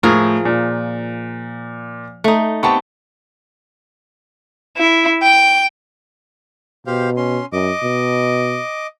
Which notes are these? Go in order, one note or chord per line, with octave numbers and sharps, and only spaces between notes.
A2 F3 G#4 A#4
A#2
A3 D#4
B3 C4 G4 A5 C#6
E4
G5
B2 G4 C5 F5
C#4 C6
F#2 D#5 D6
B2